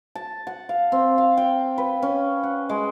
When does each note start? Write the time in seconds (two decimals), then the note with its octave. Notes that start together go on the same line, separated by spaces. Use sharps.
0.15 A5
0.47 F#5
0.69 F5
0.92 C4
1.18 F5
1.37 G5
1.78 B4
2.02 C#4
2.43 F#5
2.69 G#3